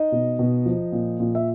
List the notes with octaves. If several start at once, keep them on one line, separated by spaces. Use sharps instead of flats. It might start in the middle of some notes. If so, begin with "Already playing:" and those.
Already playing: D#4 D#5
B2
B2
F3
A#2
A#2
E5